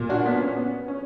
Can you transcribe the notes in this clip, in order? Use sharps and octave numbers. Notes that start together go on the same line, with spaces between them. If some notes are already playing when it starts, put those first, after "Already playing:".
Already playing: A#2
D4 F#4
B3 D4
C#4
B3
C#4